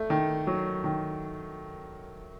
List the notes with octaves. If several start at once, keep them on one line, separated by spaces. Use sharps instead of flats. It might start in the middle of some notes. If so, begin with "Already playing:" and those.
Already playing: A3
D#3
F#3
D#3